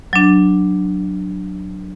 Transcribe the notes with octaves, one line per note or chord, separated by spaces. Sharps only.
F#3 D4